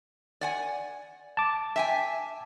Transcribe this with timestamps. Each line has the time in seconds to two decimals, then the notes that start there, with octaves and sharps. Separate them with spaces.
0.41 D5 F#5 G#5
1.37 A5 D6
1.76 E5 G5 G#5